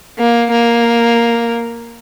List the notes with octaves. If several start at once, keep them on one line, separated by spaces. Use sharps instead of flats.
A#3
A#3